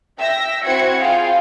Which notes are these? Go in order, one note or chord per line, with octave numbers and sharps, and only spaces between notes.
E5 G5 E6 A#6
C4 E4 F#4 C5 G#6 C#7
F4 G#4 F5 G5